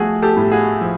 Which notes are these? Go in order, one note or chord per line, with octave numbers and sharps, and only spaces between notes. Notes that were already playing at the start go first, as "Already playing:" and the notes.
Already playing: F3 A3 F#4 G#4
G4 A4
A2
F#4 G#4
F3